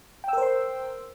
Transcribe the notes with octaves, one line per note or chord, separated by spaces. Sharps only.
A#4 C5 G5 C6 E6